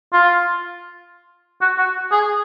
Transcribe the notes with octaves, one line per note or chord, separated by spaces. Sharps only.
F4
F#4
F#4
G#4